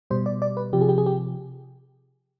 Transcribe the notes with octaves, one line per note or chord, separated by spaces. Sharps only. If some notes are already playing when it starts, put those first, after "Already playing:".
B2 G3 C5
D5
D5
B4
C3 F3 G4
G#4
G4
G#4
G4